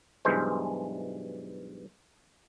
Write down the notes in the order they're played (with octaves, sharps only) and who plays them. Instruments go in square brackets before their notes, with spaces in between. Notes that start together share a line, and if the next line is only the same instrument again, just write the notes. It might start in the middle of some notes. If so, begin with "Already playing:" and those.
[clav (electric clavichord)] B1 G2 E3 G#3 C5